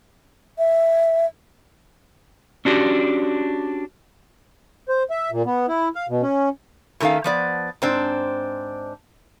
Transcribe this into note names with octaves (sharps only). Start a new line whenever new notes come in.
E5
C#4 D4 F#4 G4
C5
E5
A#2
B3
E4
F5
B2
C#4
B2 D#3 A3 C#4 F5
F3 B3 D5
G#2 C4 D4